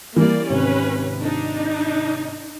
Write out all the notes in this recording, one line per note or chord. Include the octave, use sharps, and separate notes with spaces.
E3 G3 A#3 D5
G#1 C3 C#4 B4
D4 D#4